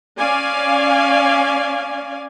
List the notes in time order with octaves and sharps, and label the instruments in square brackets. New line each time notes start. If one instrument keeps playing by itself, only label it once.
[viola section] C#4 D5 F5 G#5